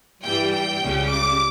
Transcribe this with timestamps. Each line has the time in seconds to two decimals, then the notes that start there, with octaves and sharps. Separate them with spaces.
0.23 G2 E3 G3 G5
0.52 G5
0.81 C#2 C#3 G3
1.10 D6